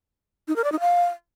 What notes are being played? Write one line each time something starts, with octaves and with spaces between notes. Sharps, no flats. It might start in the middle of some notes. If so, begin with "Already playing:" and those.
D#4
A#4
D5
D#4
F5